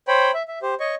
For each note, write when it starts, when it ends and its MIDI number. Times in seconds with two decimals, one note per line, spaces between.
0.08 0.31 72
0.08 0.31 73
0.08 0.31 79
0.08 0.31 83
0.34 0.43 76
0.48 0.59 76
0.62 0.74 67
0.62 0.74 72
0.80 0.95 73
0.80 0.95 75
0.80 0.95 85